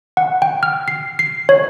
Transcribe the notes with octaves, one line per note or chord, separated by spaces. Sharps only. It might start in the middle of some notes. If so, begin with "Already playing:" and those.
F#5
G5
F6
C7
C7
C#5